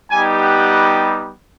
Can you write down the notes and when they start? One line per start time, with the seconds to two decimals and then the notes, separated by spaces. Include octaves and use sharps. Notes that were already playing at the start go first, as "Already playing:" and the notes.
0.10 G3 B3 D#4 G4 G#5
0.40 F#5